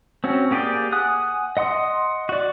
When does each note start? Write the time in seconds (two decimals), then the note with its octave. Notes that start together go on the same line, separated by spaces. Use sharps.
0.24 C4 C#4 F#4
0.51 A#3 G4 G#4 D5 G5
0.92 F#5 G#5 D#6 F#6
1.57 D#5 F#5 C6 D#6
2.29 F#4 D5